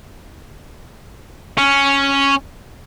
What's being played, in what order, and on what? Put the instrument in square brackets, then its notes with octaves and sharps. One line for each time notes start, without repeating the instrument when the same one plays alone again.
[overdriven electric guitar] C#4